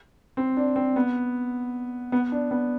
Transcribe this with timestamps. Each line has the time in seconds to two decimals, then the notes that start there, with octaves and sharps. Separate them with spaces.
0.37 C4
0.57 D4
0.76 C4
0.96 B3
2.12 B3
2.32 D4
2.51 B3